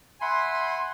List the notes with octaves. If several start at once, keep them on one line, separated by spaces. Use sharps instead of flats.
E5 F#5 G#5 B5 C6